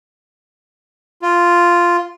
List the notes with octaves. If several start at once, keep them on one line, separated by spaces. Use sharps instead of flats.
F4